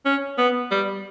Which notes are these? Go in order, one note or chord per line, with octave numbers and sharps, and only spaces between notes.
C#4
B3
G3